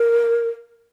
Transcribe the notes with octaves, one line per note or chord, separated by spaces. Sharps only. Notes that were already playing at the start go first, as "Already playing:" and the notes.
Already playing: A#4